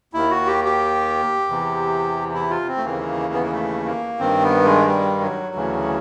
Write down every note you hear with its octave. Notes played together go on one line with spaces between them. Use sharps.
D#2 D#3 E4
F#4
G4
G4
E2 C3 E3
E4
F4
C4
A3
D#2 C#3 E3 A#3
B3
A#3
A3
A#3
G2 D#3 C4
B3
G#3
G3
F#3
D2 C#3 E3